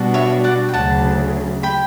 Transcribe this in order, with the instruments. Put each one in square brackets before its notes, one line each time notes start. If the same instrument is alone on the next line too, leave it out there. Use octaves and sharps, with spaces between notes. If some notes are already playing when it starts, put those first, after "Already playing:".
Already playing: [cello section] B2 G3 D4 F#4
[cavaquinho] C#5 E5
D5 F#5
G5
[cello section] D2 C#3 F#3 [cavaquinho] F#5 A5
[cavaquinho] G5 B5